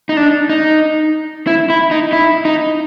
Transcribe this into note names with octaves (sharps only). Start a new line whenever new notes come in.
D#4
D4
D#4
E4
E4
D#4
E4
D#4